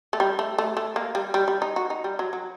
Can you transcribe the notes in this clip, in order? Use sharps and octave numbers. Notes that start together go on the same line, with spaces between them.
A3
G3
A3
A3
A3
A#3
G3
G3
G3
D#4
F#4
D#4
G3
F#3
F#3